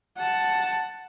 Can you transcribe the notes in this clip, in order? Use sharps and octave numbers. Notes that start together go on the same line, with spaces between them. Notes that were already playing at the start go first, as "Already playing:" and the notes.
F#5 A5